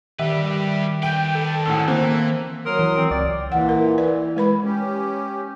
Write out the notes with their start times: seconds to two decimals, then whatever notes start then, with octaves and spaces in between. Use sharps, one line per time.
0.19 D#3 G3 G4 B4 E5
1.03 B4 D5 G5 G6
1.35 A4
1.66 D2 A2 C#3 F3 E6
1.88 E3 A#3 C4
2.66 F#3 A#4 C6 D#6
2.79 E3
2.97 C4
3.11 C#2 D5
3.52 A#2 E3 F#5
3.69 A#4
3.98 E3 B4 D5
4.36 G#3 B4 B5
4.64 C#4 G4